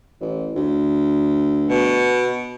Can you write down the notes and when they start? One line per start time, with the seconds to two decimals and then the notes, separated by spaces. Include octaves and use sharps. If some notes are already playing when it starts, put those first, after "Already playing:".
0.21 A1
0.55 D2
1.69 B2